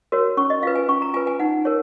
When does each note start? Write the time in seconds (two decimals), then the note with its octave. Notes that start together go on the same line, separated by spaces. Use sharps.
0.12 F#4 A#4 C#5
0.37 C#4 C#6
0.50 D#5
0.63 F4 B4 F5
0.75 G#5
0.88 C#4 C#6
1.02 A#5
1.14 F4 B4 G#5
1.27 G#5
1.40 D#4 F#5
1.65 A#4 C#5